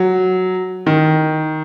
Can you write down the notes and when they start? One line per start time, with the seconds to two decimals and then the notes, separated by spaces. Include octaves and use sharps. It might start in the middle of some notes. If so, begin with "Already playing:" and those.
Already playing: F#3
0.86 D#3